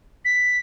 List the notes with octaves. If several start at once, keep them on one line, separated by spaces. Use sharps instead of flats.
B6